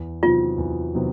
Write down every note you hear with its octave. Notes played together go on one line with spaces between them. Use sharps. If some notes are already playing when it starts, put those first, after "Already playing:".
Already playing: E2
C3 D#3 F#3 B3 F4
E2
C3 D#3 F#3 B3